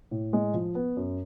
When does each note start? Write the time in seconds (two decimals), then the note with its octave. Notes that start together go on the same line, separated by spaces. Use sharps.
0.11 A2
0.33 G#3
0.54 F3
0.75 B3
0.97 F#2